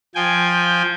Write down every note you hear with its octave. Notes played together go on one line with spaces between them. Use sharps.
F3 G5 G#5